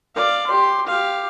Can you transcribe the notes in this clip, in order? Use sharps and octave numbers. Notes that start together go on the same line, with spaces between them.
D5 F5
G4 C6
G4 F5